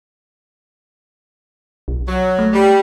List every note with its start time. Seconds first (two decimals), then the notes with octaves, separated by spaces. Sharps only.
1.88 B1
2.07 F#3
2.39 A3
2.52 G3